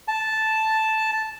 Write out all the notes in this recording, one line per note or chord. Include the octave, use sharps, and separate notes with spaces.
A5